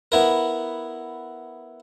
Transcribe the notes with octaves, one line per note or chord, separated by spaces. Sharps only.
B3 E4 A#4